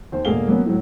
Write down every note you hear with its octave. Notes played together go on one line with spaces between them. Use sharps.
D#2 C5
E1 A#3 G#4 A4 F5 G7
F#3 A#3 B3 C#4
A2 F#3